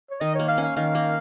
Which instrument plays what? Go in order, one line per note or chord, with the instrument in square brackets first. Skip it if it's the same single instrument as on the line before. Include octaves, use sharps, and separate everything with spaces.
[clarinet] C#5
[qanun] D#3 [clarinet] D#5
[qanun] A#3 [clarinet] C#5
[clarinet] F5
[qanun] C#4
[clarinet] F5
[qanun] D#3 [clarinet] F5
[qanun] A#3